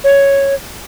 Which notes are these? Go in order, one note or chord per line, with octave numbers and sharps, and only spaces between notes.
C#5